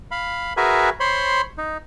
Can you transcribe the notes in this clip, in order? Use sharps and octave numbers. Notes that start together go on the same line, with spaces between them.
F5 B5
F#4 G#4 A#4 B4 E5 G#5
C5 C#5 B5 C6
D#4